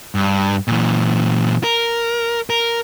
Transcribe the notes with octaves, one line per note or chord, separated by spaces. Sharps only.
G2
A#2 E3
A#4
A#4